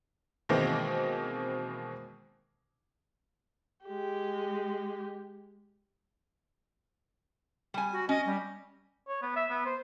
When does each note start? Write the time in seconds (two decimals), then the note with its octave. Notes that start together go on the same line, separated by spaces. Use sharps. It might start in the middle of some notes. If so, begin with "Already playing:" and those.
0.49 B2 D#3 E3 G#3 A#3 C4
3.85 G#3 G4
7.74 G3 G#5
7.92 F#4
8.09 C#4 D#5
8.26 G3
9.08 C#5
9.22 B3
9.36 E5
9.50 B3
9.66 C5